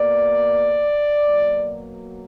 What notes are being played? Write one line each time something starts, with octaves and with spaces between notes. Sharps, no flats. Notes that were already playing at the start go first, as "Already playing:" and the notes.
Already playing: B2 A#3 D5
B2 F#3 A#3